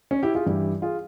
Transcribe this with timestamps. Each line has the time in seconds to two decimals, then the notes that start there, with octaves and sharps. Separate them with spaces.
0.11 C#4
0.23 E4 G4
0.35 F4 G#4
0.46 G2 E3 E4 G4
0.82 F4 G#4